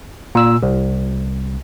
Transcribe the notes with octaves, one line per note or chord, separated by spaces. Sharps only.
A#2 E6
C2